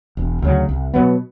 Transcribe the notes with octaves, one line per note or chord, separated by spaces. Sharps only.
E1
D2 C#3 F#3
C2
B2 F#3 B3